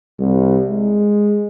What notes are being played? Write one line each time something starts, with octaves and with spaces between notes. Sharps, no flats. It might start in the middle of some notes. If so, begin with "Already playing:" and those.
C2
G#3